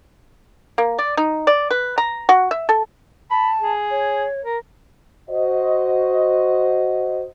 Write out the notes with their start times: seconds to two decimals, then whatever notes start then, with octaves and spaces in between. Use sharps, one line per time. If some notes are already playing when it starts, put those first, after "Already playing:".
0.78 A#3
0.98 D5
1.17 D#4
1.47 D5
1.70 B4
1.98 A#5
2.29 F#4
2.51 E5
2.69 A4
3.31 A5 B5
3.61 G#4
3.91 C#5
4.45 A#4
5.29 F#4 C5 D#5